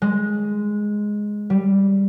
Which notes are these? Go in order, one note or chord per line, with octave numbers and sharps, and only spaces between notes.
G#3
G3